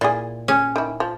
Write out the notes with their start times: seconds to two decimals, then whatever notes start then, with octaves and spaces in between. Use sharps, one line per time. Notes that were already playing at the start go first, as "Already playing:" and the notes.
0.01 A#2 E4 G#4
0.48 C#4 G#4
0.76 D#3 E3 E4
1.00 F3